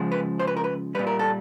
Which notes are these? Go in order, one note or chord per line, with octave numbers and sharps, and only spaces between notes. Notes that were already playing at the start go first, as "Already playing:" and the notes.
Already playing: C#3 F3 G#3
B4
C5
B4
A#4
B4
A#2 G3 B4
A#4
A4